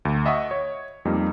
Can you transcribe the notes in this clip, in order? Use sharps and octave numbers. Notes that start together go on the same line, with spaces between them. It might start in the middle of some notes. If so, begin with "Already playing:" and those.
D2
D#5 E5 F#5 C#6 D#6
C#5
F2 G3 A#3 D#4